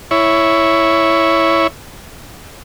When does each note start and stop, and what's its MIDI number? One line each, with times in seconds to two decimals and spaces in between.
0.11 1.67 64
0.11 1.67 73